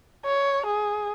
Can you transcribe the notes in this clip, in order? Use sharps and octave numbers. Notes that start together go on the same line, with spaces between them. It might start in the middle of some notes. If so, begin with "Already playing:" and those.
C#5
G#4